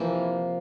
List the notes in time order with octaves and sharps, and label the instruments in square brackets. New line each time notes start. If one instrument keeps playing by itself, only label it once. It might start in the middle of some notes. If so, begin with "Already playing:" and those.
Already playing: [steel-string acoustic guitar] C3 F3 A#3 [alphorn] E3